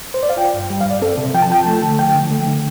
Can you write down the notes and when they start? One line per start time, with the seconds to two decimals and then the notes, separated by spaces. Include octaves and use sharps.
0.14 C5
0.23 D5
0.30 F5
0.37 F4 G5
0.54 G2
0.70 G3
0.81 F5
0.85 G2
0.91 D5
1.02 C4 A4
1.18 C3
1.34 F3 G5
1.42 A5
1.50 F4 G5
1.66 A3 A5
1.82 D3
1.99 F3 G5
2.15 D3
2.31 A3
2.47 D3